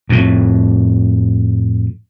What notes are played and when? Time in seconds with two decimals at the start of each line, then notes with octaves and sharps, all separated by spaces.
0.09 F2 A2